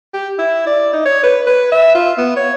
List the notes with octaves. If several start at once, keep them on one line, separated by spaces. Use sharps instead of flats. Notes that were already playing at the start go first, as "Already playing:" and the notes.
G4
E4
D5
D#4
C#5
B4
B4
E5
F4
B3
C#5